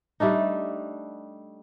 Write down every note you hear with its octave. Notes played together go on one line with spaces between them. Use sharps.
G3 A3 D4 D#4